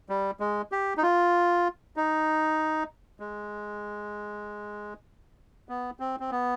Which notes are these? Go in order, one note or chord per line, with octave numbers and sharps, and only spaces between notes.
G3
G#3
G4
D#4
F4
D#4
G#3
B3
C4
C4
B3